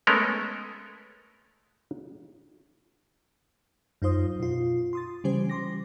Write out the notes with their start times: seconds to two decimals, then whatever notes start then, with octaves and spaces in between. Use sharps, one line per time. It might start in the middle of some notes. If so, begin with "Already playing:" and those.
0.07 G#3 A3 B3 C#4 A4 A#4
4.02 F#2 D#4 F4 C5 D#6
4.40 B2 F4
4.93 C6 D#6 A6
5.24 C#3 E3 G3 C#4 G4 C5
5.50 C6 D6 A#6